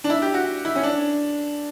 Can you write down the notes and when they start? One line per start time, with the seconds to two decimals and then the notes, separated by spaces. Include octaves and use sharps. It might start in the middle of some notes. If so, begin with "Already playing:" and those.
0.04 D4
0.10 E4
0.22 G4
0.34 F#4
0.65 E4
0.76 C#4
0.83 D4